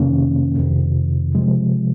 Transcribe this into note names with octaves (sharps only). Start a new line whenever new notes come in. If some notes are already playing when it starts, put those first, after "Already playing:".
Already playing: F2 C3 D#3 A#3 C#4
F2 C3 D#3
C3 F3 G#3